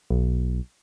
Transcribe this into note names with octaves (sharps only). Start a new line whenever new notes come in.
B1